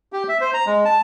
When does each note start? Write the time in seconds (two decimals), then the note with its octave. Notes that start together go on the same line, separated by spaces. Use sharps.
0.13 G4
0.28 E5
0.41 C5
0.54 A#5
0.66 G#3
0.85 A5